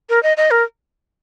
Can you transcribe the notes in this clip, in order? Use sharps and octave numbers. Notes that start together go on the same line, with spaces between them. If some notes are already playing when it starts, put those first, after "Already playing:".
A#4
D#5
D#5
A#4